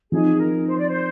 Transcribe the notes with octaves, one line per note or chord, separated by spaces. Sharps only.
F3 C4 D#4 G#4
A#4
C5
D5
C5